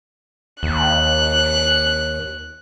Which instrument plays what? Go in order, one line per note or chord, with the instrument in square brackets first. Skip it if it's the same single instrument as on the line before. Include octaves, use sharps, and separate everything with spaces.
[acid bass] D#2 [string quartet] F#6